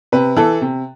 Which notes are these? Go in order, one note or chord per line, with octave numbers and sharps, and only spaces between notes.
C3 B4
E3 A4
C3